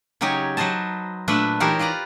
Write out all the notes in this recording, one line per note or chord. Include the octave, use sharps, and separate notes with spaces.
C#3 F#3 D#4 G4 C#5 G#5
F#3 B4 C5 D#5 A5
A#2 A3 D4 B4 E5 A5
E3 D#4 G4 A#4 C5 C#5
F4 B4 D5 A#5